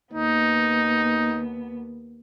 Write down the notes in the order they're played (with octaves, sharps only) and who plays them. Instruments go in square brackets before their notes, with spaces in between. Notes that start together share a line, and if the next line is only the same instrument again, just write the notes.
[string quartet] D#2 B3 [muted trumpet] D#4